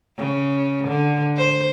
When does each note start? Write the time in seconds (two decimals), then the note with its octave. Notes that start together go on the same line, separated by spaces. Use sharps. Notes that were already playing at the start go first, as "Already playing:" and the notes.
0.17 C#3
0.88 D3
1.36 C5